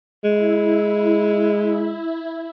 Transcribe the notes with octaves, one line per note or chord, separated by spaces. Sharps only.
G#3 E4